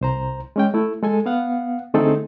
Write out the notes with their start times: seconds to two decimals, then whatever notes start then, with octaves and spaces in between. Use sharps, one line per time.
0.01 C2 C5 A#5
0.56 G#3 C#4 G5
0.74 A3 E4
1.03 G#3 A4 G#5
1.26 B3 F5 F#5
1.94 D3 A3 C4 D#4 G#4 A4